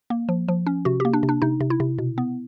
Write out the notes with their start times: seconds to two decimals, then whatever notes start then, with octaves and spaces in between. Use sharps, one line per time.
0.10 A#3
0.29 F3
0.48 F3
0.67 C#4
0.85 C3 F#4
1.00 A#3 G4
1.13 D4
1.23 C3
1.29 D4
1.42 C3 D#4
1.60 C3
1.70 E4
1.80 C3
1.98 B2
2.18 B3